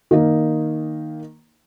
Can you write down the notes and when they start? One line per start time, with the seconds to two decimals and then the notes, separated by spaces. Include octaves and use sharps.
0.11 D#3 A#3 D#4